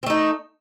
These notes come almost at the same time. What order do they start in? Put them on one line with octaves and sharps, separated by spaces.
C4 A3 D#4